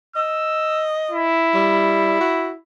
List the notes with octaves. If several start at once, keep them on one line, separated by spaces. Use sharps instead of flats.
D#5 E6
E4
G3
F#4